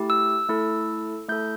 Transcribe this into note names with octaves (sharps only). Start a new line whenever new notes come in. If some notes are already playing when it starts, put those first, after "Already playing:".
Already playing: A3 E4 G4
E6
A3 E4 A4
A3 E4 A4 G6